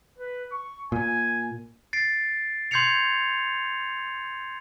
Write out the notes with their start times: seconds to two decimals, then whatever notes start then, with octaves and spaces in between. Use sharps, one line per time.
0.18 B4
0.51 C#6
0.92 A#2 G#5
1.93 A6 C7 D7
2.71 C6 G6 G#6 C7 C#7 F7